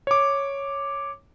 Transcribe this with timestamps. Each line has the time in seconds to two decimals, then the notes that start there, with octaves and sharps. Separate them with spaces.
0.07 C#5 D6